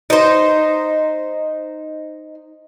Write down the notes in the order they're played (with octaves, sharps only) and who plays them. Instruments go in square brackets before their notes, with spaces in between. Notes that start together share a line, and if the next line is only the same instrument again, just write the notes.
[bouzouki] D#4 C5